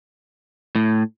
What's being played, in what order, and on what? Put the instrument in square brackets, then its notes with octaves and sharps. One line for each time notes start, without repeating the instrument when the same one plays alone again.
[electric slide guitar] A2